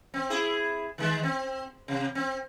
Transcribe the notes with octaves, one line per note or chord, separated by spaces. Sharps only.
C4
E4 G#4
D#3 G#3
C4
C3
C4